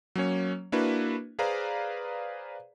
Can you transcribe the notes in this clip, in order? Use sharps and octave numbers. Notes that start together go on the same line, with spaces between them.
F#3 A#3 C#4 C#5
A#3 D4 E4 F#4 B4
G#4 B4 C5 D5 F5 A#5